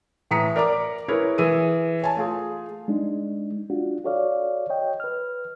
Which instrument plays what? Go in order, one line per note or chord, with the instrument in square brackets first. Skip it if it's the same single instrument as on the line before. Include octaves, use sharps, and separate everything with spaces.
[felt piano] A2 E3 A#5 D#6 B6 C#7
A#4 D5 A#5 D6
E4 G#4 A#4 B4 C#5
E3 G#4 E6 D#7
C#5 G#5 A5
A3 F4 G#4
[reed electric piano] G#3 D4 D#4
D4 F4 F#4
F#4 A4 C#5 D5 F5
C#5 D#5 G5
B4 F6